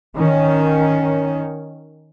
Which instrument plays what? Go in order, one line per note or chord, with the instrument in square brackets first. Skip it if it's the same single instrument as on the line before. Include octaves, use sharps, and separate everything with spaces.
[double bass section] D#3 C#4